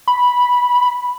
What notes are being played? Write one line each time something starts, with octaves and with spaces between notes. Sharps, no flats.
B5